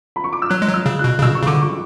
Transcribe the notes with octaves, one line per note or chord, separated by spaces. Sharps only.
B5
C#6
D6
E6
F#3 F#6
G#3
F#3
E6
C#3
F#6
B2
C#3
B2 E6
C#6
C#3
D3 D6
C#6